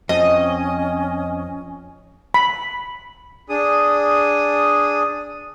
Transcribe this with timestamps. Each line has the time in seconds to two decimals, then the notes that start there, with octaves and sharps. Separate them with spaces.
0.09 F2 C#4 D#5
2.34 B5
3.50 D4 G#4 D#6